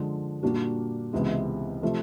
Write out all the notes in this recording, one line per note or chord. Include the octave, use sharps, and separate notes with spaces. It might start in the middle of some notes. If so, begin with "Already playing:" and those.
Already playing: D3 F3 G#3
A#2 G3 A#3 D4 F#4
C#2 C3 E3 G#3 B3
C3 F3 A3